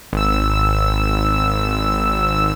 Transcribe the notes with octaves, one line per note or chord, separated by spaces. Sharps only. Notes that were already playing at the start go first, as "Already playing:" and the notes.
G#1 E6